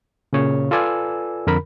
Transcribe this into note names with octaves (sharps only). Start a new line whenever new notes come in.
A#2 C#3 C#5
F4 A4 B4 D5 G#5 E6
F2 D3 A#4 B5